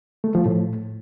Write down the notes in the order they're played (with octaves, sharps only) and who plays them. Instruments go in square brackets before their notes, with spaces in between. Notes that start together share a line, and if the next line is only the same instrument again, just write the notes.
[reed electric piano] A3
F3
A2